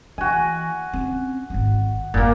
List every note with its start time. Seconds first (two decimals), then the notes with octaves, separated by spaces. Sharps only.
0.18 E3 F#4 G#5
0.93 C4 C#4
1.50 G#1 B3
2.14 G1 A#2 A#3